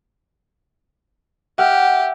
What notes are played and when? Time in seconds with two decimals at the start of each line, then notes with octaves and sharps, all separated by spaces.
1.58 G4 E5 F#5 F6